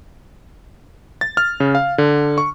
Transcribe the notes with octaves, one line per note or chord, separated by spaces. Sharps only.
A6
F6
C#3
F5
D3
C#6